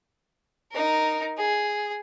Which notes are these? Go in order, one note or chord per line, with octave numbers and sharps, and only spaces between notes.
D#4 A#4
G#4